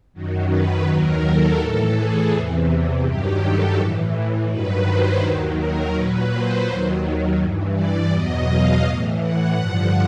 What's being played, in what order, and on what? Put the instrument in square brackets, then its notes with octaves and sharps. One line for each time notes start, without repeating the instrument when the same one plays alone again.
[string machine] F#2 D#3 F#3
B4
D#2 D#3 F#3 A#4
A4
A2 E3 A4
G#4
E2 C3 E3
G2 D#3 F#3 G4
A4
A2 E3
G2 D#3 F#3 B4
C5
D#2 D#3 F#3
A#4
A#2 F#3 B4
C5
D#2 D#3 F#3
G2 E3
D5
E2 B2 F#3 D#5
F5
A2 E3
F#5
G2 D3 F3 F#5